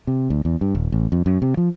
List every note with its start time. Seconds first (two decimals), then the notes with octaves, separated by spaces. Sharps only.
0.07 C3
0.30 D2
0.45 E2
0.61 G2
0.75 D#1
0.92 A1
1.12 F2
1.26 F#2
1.42 C3
1.57 F3